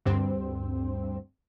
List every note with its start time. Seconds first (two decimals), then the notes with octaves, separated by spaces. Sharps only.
0.05 D2 G2 C4